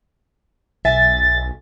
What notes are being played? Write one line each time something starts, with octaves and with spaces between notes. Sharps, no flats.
B1 E5 G#5 A6